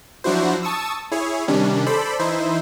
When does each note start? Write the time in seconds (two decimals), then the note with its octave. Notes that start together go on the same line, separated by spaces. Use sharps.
0.24 F3 F#3 D4 E4 F#4 C5
0.63 A5 C#6 D#6 E6
1.12 E4 G#4 C#5
1.48 C3 D#3 G3 C#4 D4
1.86 A4 C5 D5 B5
2.19 E3 D#4 E4 C5